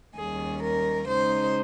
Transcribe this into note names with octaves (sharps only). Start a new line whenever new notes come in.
D#2 D#3 G3 C#4 G#4
A#4
C#3 G#3 D#4 C5